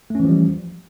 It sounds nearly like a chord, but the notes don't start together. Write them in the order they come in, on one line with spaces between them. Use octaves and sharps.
A3 C#4 E3 F3 G3